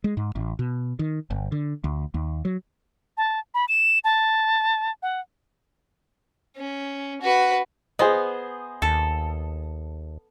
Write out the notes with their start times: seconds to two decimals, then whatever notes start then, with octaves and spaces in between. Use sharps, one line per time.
0.04 G#3
0.17 G#2
0.35 A1
0.59 B2
0.99 D#3
1.30 G1
1.52 D3
1.84 D2
2.14 D#2
2.45 F#3
3.17 A5
3.54 B5
3.69 E7
4.04 A5
5.02 F#5
6.57 C#4
7.21 F#4 B4
7.99 B3 G#4 C5 D#5
8.82 D#2 A4